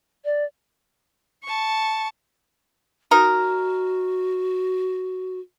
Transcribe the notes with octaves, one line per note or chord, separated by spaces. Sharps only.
D5
A5 C#6
D#4 F#4 A#4